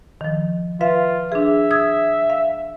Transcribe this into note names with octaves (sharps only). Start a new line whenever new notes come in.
D#3 F3
F4 B4 E5 F5
D4 G#4 E5
D#6 E6 G#6
F5